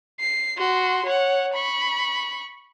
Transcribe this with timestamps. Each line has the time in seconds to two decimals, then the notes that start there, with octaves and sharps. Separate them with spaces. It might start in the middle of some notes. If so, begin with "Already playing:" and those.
0.20 C7
0.57 F#4 C6
1.06 C#5 F#5
1.54 B5 C#6